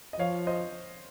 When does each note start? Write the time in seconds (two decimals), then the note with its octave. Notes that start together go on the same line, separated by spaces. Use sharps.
0.13 D#5
0.19 F3 C#5 F5
0.47 C5 D#5